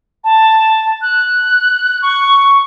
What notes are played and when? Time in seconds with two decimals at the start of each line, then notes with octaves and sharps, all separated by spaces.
0.24 A5
1.02 F#6
2.02 C#6